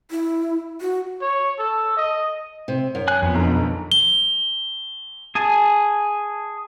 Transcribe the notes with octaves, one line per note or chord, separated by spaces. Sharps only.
E4
F#4
C#5
A4
D#5
C3
F#2
G#5 F#6
F2 F3 B3 G#5
B1 D3 A#5
G7
G#4 G#5 A5